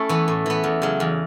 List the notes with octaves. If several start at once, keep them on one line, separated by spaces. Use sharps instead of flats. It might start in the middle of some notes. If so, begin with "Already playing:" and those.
Already playing: A3 C#4 E4
E3 B3
A2
E3 B3
E2
C#3 F#3
E2